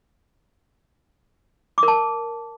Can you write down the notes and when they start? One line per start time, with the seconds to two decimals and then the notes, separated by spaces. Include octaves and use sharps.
1.78 D6
1.83 A#4
1.88 A5